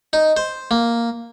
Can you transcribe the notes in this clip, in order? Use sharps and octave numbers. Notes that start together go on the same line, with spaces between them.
D#4
C5
A#3